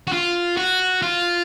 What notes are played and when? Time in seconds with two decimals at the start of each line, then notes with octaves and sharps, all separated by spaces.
0.07 F#4
0.13 F4
0.57 F#4
1.02 F4